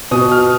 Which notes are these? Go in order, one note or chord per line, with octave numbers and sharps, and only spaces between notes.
B2 D#6
F6